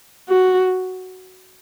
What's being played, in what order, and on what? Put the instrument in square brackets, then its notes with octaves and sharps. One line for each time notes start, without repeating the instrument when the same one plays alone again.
[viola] F#4